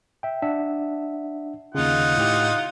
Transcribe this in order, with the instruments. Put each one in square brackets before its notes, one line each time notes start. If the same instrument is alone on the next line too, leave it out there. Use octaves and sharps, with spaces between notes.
[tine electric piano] E5 G5
D4 E5 F#5
[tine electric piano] D#2 C#3 [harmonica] D#4 F4 F#5
[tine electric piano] A2 G4